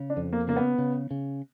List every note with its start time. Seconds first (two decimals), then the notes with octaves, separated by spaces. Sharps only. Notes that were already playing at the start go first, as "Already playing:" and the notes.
Already playing: C#3
0.10 D4
0.17 F2
0.33 A#3
0.48 C#3 A#3
0.56 B3
0.78 C#3
1.11 C#3